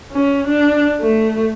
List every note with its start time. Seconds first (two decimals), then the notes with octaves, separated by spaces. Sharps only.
0.12 C#4
0.48 D4
1.01 A3